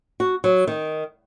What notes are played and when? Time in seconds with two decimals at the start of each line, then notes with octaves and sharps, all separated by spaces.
0.20 F#4
0.44 F#3
0.67 D#3